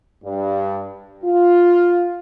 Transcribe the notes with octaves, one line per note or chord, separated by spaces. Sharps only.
G2
F4